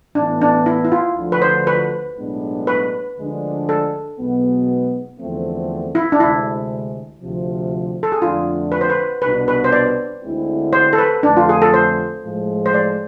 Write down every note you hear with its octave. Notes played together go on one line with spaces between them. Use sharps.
A2 E3 B3 D4
D4
E4
E4
F4
D2 D3 F3
B4
C5
B4
B1 A2 G#3 B3 D4
B4
D2 D3 F3 G#3 D4
A4
B1 B2 G#3 B3
E2 D3 F3 A3 C4
E4
D4
D2 C3 G#3 E4
D2 C3 F3
A4
G#4
F2 D3 A3 D4 F4
B4
C5
B4
C2 B2 B3 D4 B4
B4
C5
D5
D2 D3 G#3 C4 E4
C5
A4
B4
F2 D3 A3 D4
F4
G#4
A4
C5
A2 F3 G#3
C5
D5